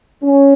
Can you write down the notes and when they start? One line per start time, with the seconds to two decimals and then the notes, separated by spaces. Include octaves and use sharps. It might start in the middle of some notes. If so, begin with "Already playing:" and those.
0.23 C#4